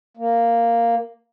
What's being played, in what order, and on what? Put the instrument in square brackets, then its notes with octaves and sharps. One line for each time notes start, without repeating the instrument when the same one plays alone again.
[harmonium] A#3